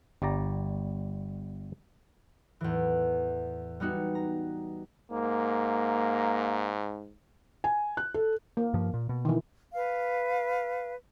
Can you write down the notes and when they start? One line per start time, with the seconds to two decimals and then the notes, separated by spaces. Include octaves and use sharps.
0.22 G1 G3 D5 A#5
2.61 E2 A2 E3
3.80 G3 B3 D#4 F#4
4.15 A#5
5.11 G#2 A#3
7.64 G#5
7.97 F#6
8.14 A4
8.57 A#3
8.74 G2 F3
8.94 A#2
9.09 B2
9.25 D#3 E3
9.73 B4 F5